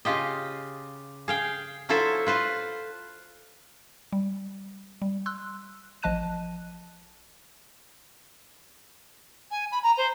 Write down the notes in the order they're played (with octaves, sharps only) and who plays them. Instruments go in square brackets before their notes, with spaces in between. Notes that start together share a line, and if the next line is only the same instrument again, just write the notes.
[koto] C#3 F4 G4 D#5
G#4 F5 G5
F#3 E4 F4 A4 C5 E5
F4 B4 C5
[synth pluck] G3
G3
C6 E6 F#6
A1 F3 D#5 A5 F#6 D#7
[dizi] G#5
B5
A#5
C5